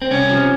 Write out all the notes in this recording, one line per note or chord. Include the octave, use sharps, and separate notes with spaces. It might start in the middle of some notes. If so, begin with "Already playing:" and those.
C4
C2 C#4
C3 F3